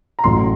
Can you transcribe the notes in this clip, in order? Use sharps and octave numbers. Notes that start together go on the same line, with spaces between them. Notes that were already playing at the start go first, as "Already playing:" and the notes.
A#5
A1 A2 F#3 C6